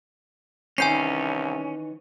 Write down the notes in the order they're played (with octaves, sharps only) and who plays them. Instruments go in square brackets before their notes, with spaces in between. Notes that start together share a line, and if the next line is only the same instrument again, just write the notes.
[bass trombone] C2 [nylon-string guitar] D#3 E3 [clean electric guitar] C#4 [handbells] G#5 G6 C7